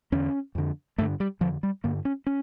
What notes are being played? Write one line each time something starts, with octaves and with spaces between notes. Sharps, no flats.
E2 D3 C#4
F2 D3
G2 D3 A3
G3
F2 D3 F3
G3
G2 D3 A#3
C#4
C#4